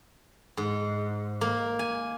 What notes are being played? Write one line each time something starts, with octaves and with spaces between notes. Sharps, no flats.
G#2
A#3
G#5